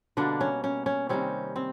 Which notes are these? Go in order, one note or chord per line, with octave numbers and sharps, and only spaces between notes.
B2 D3 G3 A#3 D4
C#4
C#4
C#4
C3 D#3 G3 C4 C#4
C4